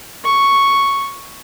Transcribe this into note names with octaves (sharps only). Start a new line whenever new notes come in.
C#6